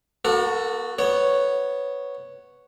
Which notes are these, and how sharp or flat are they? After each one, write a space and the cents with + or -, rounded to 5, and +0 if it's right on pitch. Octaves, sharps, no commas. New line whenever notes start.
A#3 +45 F#4 +0 A4 +15
B3 +0 C#5 +0